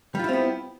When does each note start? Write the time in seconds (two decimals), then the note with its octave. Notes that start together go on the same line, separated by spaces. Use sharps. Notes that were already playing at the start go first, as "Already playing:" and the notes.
0.15 G3
0.19 F4
0.24 E4
0.29 C4
0.33 B3